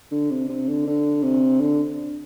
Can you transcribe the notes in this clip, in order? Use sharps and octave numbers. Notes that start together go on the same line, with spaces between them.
D3
C3
C3
D3
D3
C3
D3